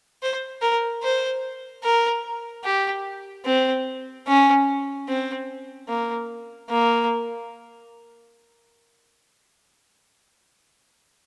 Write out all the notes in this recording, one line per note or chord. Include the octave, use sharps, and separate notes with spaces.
C5
A#4
C5
A#4
G4
C4
C#4
C4
A#3
A#3